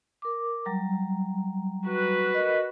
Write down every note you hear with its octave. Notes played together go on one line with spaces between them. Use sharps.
A#4 D6
F#3 G3 A#5
F#4 B4
A#4 D#5